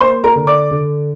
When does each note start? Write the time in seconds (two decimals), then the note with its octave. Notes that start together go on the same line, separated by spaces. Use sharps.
0.01 A#3 C5 C6
0.24 A#4 A#5
0.36 D3
0.47 D5 D6
0.71 D3